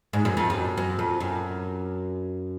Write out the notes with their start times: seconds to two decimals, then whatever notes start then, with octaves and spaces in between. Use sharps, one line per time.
0.13 G#2
0.25 F#2
0.37 F2
0.50 F#2
0.77 F#2
0.99 F2
1.20 F#2